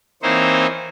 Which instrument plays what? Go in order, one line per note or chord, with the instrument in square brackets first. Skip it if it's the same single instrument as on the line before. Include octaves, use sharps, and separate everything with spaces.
[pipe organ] E3 A#3 C4 D#4 C5 C#5